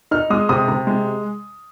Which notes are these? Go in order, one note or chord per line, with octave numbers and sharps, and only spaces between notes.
D#4 F6
G#3 D#6
C3 D#6
C3
G#3